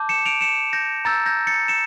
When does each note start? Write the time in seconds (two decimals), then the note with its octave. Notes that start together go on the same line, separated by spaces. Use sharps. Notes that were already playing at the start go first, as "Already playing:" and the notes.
Already playing: A5 D6 G6
0.09 C#7 E7
0.26 D7 F7
0.41 C#7 E7
0.73 G6 A#6
1.05 A#5 E6 G6 A6
1.26 G6 A#6
1.47 A6 C#7
1.68 C#7 E7